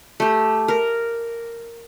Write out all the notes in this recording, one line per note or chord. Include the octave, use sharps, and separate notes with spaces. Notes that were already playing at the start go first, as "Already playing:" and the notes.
A3 G4
A#4